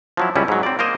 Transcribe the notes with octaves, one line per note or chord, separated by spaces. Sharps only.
F3 F#3 E4
C#2 G3 C#4 E4
G#2 F#3
C4 D5
A#3 A#4 C5 D#5